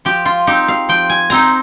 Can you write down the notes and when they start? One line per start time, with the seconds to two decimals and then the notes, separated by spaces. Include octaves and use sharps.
0.05 F3 G4
0.26 F4
0.47 C4 D#4 G4
0.68 F5
0.89 F3 G5
1.10 G#5
1.30 C4 D#4 A#5